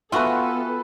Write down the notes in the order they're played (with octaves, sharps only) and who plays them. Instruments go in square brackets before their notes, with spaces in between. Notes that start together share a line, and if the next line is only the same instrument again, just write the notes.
[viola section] B3 A4 [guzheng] F4 F#4 [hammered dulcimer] B4 G5 G#5 [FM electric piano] E5